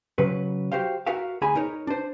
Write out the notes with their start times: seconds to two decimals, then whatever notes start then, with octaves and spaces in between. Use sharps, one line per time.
0.18 C#3 F#3 B4
0.72 F#4 G4 C5 F5
1.07 F#4 A#4 E5 F5
1.42 D2 G#4 G#5 B5
1.55 D#4 A#4 C#5
1.87 D4 C5